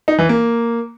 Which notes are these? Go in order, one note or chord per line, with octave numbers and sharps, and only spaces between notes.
D#4
E3
A#3